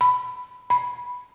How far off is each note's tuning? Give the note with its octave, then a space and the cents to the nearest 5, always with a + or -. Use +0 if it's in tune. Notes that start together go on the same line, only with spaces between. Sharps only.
B5 +15
B5 -5